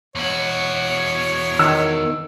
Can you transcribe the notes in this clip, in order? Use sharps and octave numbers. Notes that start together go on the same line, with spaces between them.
E2 F#4 C#5
D#3 E6